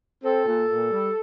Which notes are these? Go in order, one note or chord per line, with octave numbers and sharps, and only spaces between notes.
C4 A4
A#2
A#2
G3